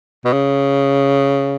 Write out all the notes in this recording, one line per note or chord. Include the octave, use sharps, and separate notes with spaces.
B2
C#3